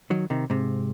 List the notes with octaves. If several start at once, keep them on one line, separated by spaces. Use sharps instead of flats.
D#3 F#3
C3 D#3
G#2 C3